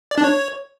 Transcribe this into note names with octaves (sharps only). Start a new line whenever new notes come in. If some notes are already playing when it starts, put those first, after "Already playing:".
D5
D4
C#5